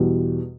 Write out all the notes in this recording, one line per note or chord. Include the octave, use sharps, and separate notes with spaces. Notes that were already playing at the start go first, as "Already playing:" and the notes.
Already playing: E2 B2 G3